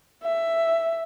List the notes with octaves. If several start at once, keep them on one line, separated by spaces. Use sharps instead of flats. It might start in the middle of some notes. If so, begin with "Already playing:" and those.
E5